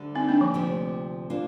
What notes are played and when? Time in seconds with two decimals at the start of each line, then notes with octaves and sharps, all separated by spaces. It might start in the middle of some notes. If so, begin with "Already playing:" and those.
Already playing: D2 D3 G3
0.15 C4 D#4
0.28 A#3 D4
0.41 F3
0.54 D2 C3 F3 C4 G4
1.30 F3 A#3 D4 F4